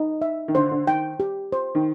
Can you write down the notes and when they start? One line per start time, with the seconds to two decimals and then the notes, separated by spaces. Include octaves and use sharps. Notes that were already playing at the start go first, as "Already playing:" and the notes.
Already playing: D#4
0.22 E5
0.48 D#3
0.54 D3 C5
0.71 D3
0.87 D#3 G5
1.20 G4
1.52 C5
1.75 D#3